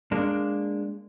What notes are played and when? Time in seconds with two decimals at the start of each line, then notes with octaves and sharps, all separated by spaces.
0.12 G#3 A#3 D4